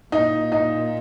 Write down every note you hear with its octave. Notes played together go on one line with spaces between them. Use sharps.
A#2 D#4
D#4